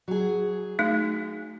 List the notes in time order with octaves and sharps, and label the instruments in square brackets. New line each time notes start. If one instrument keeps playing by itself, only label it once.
[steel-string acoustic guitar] F#3 G#4
[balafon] A3 D#4